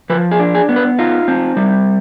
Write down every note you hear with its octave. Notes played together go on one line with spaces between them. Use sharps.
F3 B4
G#4
D4
G#4
B3
B4
D#4 F4
C4
G3